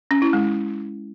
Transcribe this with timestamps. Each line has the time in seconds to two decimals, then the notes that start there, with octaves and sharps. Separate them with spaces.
0.11 C#4
0.22 E4
0.33 G#3